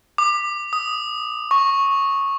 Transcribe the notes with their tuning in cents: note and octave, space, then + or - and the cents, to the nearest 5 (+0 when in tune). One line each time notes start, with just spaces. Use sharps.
D6 +25
D#6 +5
C#6 -10